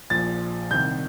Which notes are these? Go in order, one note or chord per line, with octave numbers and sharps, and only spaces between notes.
A#1 A#2 F3 A6
C2 C3 D#3 G6